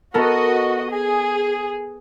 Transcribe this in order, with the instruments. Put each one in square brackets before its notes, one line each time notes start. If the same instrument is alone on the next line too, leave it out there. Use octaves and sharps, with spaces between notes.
[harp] B3 A4 A#4 [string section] F#4 D#5
[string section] G#4